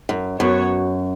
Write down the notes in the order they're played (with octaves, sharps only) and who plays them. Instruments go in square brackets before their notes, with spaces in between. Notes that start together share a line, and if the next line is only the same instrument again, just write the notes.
[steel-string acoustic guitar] F#2
[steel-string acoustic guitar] F#2 [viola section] B3 F#4 C#5